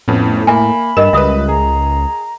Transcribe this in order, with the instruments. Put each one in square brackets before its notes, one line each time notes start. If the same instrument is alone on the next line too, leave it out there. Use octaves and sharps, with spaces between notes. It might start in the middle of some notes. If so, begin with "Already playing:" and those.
[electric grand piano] F2 B3 C#4 [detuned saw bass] A2
[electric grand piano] A#3 [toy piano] E5 G#5 [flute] B5
[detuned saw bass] G2 [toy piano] A#4 D#5 [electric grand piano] E7
[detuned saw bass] C#2 [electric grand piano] G3 B4 [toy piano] E5 D#6
[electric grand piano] G#4 [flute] A#5